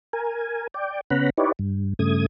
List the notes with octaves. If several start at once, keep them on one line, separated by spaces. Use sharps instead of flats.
A#4 G#5
D5 G5
C#3 B3 C#4 F#5 A#5 B5
D#4 E4 G4 B4 C#5 D5
G2
G2 C#3 A3 D#6 G#6